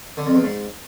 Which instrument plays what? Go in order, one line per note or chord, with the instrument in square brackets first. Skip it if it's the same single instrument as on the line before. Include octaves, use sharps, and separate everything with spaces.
[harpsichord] D3
F2
E2
G#2